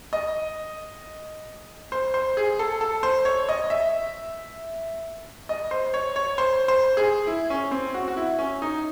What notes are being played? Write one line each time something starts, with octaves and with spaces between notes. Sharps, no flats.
D#5
C5
C5
G#4
A4
A4
C5
C#5
D#5
E5
D#5
C5
C#5
C#5
C5
C5
G#4
E4
C#4
C4
F#4
F#4
E4
C#4
D#4